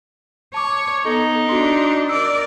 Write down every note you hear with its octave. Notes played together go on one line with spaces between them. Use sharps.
C#5 A5 D6
B3 D#4 A4
D4 F#4 C6
A#4 D5 E6